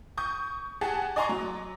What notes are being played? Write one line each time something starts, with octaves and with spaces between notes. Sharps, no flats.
C#6 D#6 G6
G4 G#4 F#5 A5
D5 D#5 G#5 A#5 C6 C#6
F#3